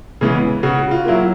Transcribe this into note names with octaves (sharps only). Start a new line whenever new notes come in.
C#3 E3 G#3 B3
C#3 F#4
F4
F#3 A#3 E4